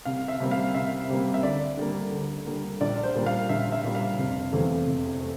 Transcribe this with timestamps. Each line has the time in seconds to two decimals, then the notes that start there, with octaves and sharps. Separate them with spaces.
0.05 C2 F5
0.28 E5
0.40 C3 G3 A#3
0.51 F5
0.75 C2 E5
1.09 C3 G3 A#3
1.34 E5
1.43 D2 D5
1.77 D3 G3 A#3
2.12 D2
2.46 D3 G3 A#3
2.81 A#1 D5
3.03 C5
3.15 A#2 G3 A#3
3.26 F5
3.49 A#1 E5
3.72 E5
3.84 A#2 G3 A#3
3.95 F5
4.18 F1
4.52 E2 C3 E3 A3
4.87 F1
5.21 A3